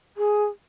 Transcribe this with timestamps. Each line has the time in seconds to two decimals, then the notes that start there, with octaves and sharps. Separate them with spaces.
0.17 G#4